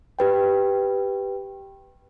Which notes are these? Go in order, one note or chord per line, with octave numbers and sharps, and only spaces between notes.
G4 B4 G5